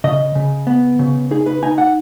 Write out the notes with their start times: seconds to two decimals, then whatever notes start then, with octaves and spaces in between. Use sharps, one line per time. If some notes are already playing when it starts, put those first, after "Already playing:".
0.04 C#3 D#5
0.35 C#3
0.67 B3
0.99 C#3
1.31 D#4 G#4
1.46 B4
1.62 D#4 G#5
1.78 F#5